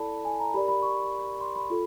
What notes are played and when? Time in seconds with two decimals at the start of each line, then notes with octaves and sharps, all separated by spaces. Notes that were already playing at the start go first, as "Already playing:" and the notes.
Already playing: E4 A4 D5 A5 B5
0.25 G#5
0.40 A#5
0.54 G4 A#4 D5 B5
0.68 B5
0.82 C#6
1.41 C6
1.55 B5
1.70 F4 A4